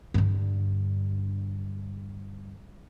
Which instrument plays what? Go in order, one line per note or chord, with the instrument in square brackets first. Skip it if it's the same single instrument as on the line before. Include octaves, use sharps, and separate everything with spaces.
[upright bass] G2 D3